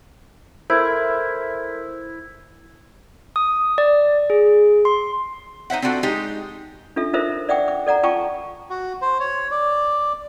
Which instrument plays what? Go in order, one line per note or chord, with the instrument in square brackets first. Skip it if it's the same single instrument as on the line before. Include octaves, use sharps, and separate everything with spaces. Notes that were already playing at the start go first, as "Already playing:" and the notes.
[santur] E4 [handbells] A4 A#4 C5
[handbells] D#6
D5
G#4
C6
[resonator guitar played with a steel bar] D#4 C5 E5 F#5
C4 D4 F4 F#4 A4
G#3 D#4 G4
[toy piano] D4 F4 A4 E5
D#4 F4 A4 A#4 C5 E5
D5 E5 F#5 G5 D6
D6
A4 D5 F#5 A#5
F4 G5 A5 A#5 C#6 D6
[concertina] F#4
C5
C#5
D5